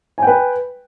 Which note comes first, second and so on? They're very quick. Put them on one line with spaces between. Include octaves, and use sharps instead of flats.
G#5 G5 B4